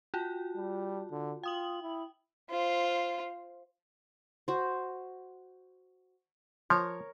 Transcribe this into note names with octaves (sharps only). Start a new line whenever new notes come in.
F4 F#4 A5
G3
D3
F4 G5 D#6 F#7
E4
F4 C5
F#4 C5
F3 A#4 C#5